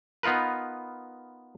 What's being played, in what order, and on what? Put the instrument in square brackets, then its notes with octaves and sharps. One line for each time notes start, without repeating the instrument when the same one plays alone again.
[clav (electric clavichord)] B3 D#4 F4 A#4 B4